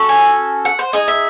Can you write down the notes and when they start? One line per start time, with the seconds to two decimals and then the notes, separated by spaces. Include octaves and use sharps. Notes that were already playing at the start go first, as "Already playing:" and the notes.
Already playing: C#4 F#4 A4
0.09 G#5
0.65 F#5
0.79 C5
0.93 D#4 G#4 D#5
1.08 E5